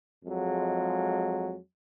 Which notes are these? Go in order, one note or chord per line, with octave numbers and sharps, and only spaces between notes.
F2 F#3 G#3